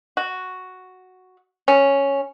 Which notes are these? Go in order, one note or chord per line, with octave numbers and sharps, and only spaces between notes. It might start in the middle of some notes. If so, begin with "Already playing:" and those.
F#4
C#4